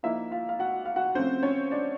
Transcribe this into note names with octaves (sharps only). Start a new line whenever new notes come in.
F3 A#3 D#4 E4 E5
F4 F5
F5
F#4 F#5
F5
F#4 F#5
C3 F3 A3 C4 C#4 C5
C#4 C#5
D4 D5